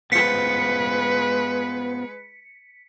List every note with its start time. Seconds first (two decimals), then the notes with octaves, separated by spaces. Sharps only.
0.12 G#3 B3 F4 B4 C5 B6 C#7